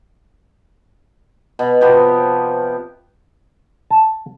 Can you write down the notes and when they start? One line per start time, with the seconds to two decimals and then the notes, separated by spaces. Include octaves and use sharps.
1.59 B2
1.81 C3 F3 B3 G4
3.91 A5